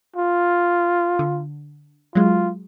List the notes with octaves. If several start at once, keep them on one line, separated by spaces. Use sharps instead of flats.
F4
D3
F#3 G#3 F4